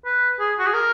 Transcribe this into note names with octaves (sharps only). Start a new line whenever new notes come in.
B4
G#4
F#4
G#4
A#4